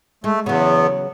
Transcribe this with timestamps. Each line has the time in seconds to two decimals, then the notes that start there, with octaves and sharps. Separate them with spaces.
0.24 G#3 A3
0.46 E2 C#3 F#3 B3